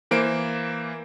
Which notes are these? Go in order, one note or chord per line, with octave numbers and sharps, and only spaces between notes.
E3 A#3 C5 D7